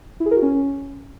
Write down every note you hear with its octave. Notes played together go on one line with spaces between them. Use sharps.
E4
G#4
A#4
F#4
C#4